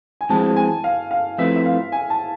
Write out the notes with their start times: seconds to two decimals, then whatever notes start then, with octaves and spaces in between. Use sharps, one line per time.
0.21 G#5
0.29 F2 E3 G#3 C4 A5
0.56 G#5
0.84 F5
1.11 F5
1.38 F3 A3 C4 E4 B4 E5
1.56 E5
1.66 F5
1.92 G#5
2.10 A5